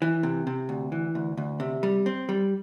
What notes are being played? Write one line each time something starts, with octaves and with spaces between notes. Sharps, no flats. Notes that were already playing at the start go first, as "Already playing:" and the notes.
E3
C3
C3
D2
E3
D2
D2
C3
G3
C4
G3